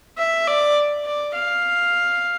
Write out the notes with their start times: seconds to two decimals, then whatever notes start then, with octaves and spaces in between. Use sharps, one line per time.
0.18 E5
0.47 D5
1.05 D5
1.34 F5